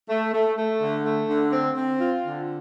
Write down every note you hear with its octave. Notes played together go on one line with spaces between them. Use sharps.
A3
A3
A3
D3
A3
D3
C4
C4
F4
D3